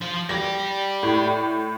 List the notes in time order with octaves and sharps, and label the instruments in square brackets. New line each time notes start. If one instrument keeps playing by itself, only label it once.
[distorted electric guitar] F3 C5
[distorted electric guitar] G4 D5 [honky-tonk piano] A#6
[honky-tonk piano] A2